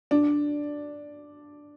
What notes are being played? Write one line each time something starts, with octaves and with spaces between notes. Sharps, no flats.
D4